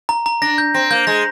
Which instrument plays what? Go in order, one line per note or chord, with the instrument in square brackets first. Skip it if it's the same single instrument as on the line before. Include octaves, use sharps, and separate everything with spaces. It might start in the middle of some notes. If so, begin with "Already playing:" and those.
[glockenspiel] A#5
A#5
[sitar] D4 [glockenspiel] A#6
[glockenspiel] G6
[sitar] C4 [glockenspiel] A#6
[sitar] A#3 [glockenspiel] G6
[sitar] G#3 [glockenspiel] A#6